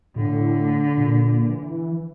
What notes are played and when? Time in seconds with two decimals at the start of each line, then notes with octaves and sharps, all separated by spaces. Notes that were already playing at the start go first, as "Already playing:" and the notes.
0.16 A2 D3
0.98 A#2
1.49 E3